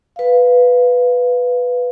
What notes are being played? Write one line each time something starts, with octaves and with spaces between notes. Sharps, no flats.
B4 F5